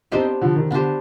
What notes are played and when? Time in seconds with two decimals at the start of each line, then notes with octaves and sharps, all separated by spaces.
0.12 B3 C4 D4 D#4 G4 C5
0.41 D3 F3
0.56 D#3
0.71 D3 B3 D4 G4 C5